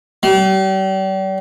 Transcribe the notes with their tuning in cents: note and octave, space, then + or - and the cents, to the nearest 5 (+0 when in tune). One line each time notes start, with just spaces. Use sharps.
G3 -40